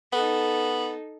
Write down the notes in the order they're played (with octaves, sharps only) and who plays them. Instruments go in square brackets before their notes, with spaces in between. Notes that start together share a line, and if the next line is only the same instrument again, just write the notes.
[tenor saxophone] B3 [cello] D#4 A4